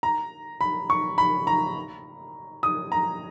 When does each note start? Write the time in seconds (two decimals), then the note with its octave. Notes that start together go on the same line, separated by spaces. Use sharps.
0.03 A#5
0.61 B5
0.90 C#6
1.18 B5
1.47 A#5
2.63 D#6
2.92 A#5